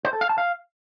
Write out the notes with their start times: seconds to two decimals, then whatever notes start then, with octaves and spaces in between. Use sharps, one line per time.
0.05 C5
0.13 A4
0.21 F5
0.29 A5
0.38 F5